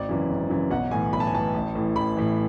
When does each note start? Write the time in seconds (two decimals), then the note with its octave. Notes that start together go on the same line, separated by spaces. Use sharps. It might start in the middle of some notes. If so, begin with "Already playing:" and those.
Already playing: G#1 D5
0.09 F#2 C#3 E3
0.29 G#1
0.50 F#2 C#3 E3
0.71 B1 F#5
0.91 A2 E3 G#5
1.13 B1 B5
1.20 A5
1.27 G#5
1.33 A2 E3 A5
1.54 A1
1.75 A2 E3
1.95 A1 B5
2.16 A2 E3